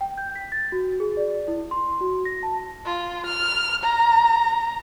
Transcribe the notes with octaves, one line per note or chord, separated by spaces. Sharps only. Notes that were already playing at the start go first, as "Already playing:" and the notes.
G5
G6
B6
A6
F#4
G#4
D5
E4
C6
F#4
A#6
A5
F4
F6
A#5